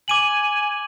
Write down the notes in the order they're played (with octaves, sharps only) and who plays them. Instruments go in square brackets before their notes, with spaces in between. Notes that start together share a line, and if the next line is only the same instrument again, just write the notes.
[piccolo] G#5 [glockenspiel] D6 D#7 F#7